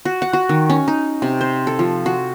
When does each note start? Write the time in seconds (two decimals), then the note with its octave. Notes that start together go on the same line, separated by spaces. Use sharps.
0.05 F#4
0.22 F#5
0.33 F#4
0.49 D#3
0.70 C#4
0.88 D#4
1.22 C3
1.41 C5
1.67 A4
1.79 F3
2.06 F#4